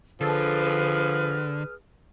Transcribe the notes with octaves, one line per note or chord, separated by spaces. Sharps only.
D3 F3 G#4 A4 B4 F6